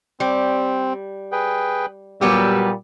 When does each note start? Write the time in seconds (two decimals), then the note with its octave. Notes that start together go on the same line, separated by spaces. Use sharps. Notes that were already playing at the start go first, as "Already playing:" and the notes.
0.20 G3 C4
1.32 G#4 B4 G5
2.21 A#2 F#3 G3 B3 G4 E6